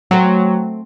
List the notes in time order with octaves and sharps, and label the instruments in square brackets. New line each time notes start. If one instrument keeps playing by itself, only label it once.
[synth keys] F#3 [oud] A3 C4